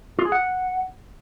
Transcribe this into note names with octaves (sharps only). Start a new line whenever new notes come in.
F4
G#4
F#5